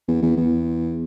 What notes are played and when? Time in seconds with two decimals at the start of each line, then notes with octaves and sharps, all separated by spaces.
0.08 E2
0.22 E2
0.37 E2